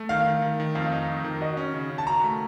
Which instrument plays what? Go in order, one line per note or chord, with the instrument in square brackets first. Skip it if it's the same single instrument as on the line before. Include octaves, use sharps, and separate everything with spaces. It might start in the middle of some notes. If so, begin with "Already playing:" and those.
Already playing: [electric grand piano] A3
[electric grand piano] D#3 [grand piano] F5
[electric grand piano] D#3
D#3
D#3
[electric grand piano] F2 [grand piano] F5
[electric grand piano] D#4
F2
D#3
[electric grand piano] F#4 [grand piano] D#5
[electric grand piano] C#4
C#3
C#3
[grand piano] A5
[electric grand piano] F#4 [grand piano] A#5
[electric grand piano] A3